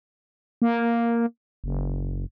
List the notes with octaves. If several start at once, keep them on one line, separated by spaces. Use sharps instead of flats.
A#3
F#1